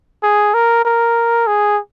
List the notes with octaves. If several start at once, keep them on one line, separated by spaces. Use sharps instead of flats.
G#4
A#4
A#4
G#4